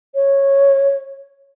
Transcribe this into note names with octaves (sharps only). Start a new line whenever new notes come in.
C#5